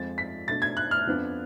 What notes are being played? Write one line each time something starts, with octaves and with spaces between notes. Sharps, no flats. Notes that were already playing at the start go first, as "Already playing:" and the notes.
Already playing: F2 F3 G#3 A6
B6
B2 A3 D4 A6
G#6
F#6
F6
F2 F3 B3 D4